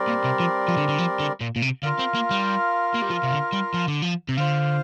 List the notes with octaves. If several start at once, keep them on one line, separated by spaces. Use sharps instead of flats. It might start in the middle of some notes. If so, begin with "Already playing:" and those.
Already playing: G3 C4 A#4 D5
A#2
C3
F3
F3
D3
D3
F3
D3
A#2
A#2
C3
D3 F4 A#4 F5
C4
A#3
G3
A#3
G3
F3
C3
D3
G3
F3
D3
F3
C3
D3 F4 C5 F5